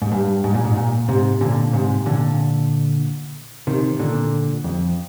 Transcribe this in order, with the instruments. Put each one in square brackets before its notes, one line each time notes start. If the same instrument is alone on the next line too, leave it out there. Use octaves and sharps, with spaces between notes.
[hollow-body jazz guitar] G#2
G2
G#2
A#2
G#2
A#2
G#2 C3
A#2 D3
G#2 C3
A#2 D3
C3 D#3
A#2 D3
F2